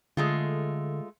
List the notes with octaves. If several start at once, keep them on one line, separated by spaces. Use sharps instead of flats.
D3 G#3 A3 F4